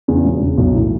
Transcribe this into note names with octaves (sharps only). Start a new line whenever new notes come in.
E2 C#3
E1
E2 C#3
B1
A2 E3